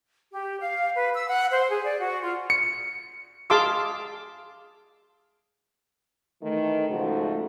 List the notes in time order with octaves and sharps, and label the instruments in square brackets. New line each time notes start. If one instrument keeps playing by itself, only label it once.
[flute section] G4
F5
B4
E6
F#5
C5
G#4
D5
F#4
F4
[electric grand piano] C#7
[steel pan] G#4 F5 A5 C6 D6 E6
[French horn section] D#3 E3 A3
G#2 C#3 F3 A3 F#4